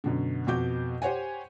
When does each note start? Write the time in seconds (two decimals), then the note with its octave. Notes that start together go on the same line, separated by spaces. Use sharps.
0.04 F#2 B2 D3
0.47 F2 B2 F#4 D6 G6
1.02 G4 C5 C#5 F#5 G#5